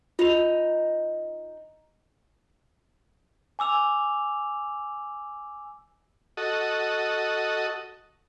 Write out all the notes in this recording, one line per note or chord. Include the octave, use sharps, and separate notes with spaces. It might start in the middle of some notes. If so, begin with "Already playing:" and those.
D#4 F4 F7
G#5 D6 E6 F7
F#4 A4 D#5